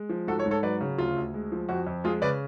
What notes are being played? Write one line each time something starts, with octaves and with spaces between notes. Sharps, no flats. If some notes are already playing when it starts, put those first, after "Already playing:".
Already playing: G#3
F3
G#2 F#4 A4
A4 C#5
G#2
A4 C#5
F#3 B4 D5
C#3
D2 F4
D2
G#3
F3
F2 F#4
F2
G#3 F4 G#4
C#3 B4 D5